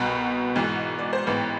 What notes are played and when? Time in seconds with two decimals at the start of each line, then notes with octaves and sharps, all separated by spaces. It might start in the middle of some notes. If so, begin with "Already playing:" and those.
Already playing: C2 B2 B3 B4
0.56 G#1 G#2 E3
0.99 D5
1.13 C5
1.27 A1 G#2 E3 B3 B4